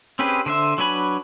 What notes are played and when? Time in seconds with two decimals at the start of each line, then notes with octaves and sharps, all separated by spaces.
0.19 C4 C#4 G4 G#4 B4
0.46 D3 C5 E5
0.78 F#3 D4 B4 G#5 B5